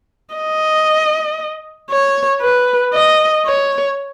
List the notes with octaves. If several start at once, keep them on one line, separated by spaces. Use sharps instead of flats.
D#5
C#5
B4
D#5
C#5